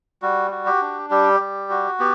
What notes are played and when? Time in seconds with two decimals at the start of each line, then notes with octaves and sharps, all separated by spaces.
0.22 G3 F#4
0.51 F#4
0.66 G4
0.81 D4
1.11 G3 G4
1.40 G3
1.70 F#4
2.00 B3 G4